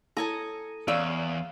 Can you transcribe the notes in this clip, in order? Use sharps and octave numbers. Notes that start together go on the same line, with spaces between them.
E4 A4 C#5 G#5 A#5 D#6
E2 C#4 C#5 D5 F5 E6